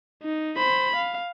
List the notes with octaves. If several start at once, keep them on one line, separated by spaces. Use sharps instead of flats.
D#4
C5 B5
F5